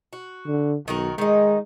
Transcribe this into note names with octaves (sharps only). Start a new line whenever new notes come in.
F#4
D3
B1 D#3 F#4 A#4
D#3 G#3 D#4